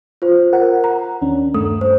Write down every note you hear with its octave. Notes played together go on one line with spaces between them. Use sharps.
F4 C5
A#4 F#5
A#5
D#2 C#4 D4
G2 A3 D#6
C5